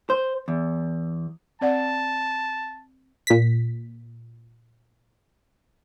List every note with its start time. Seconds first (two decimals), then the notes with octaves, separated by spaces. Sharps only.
0.10 C5
0.48 E2
1.61 C4 D5 F#5 A5
3.27 A#2 B6